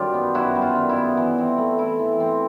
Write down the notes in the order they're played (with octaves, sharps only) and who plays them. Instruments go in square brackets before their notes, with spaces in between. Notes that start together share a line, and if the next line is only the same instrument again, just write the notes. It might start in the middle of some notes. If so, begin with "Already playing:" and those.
Already playing: [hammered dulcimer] F#2 D#3 G3 F4 G4
B3
F#2 E4 F#4
G3
F4
D#3
E4
B3
E3
C4
A3
E4
E3
C4